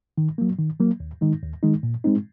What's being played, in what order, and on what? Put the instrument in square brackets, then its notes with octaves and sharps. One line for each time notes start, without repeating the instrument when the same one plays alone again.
[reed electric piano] D#3
F#3 A#3
D#3
F#3 A#3
D#2
D#3 G#3 D#4
D#2
D#3 G#3 D#4
A#2
G#3 C4 D#4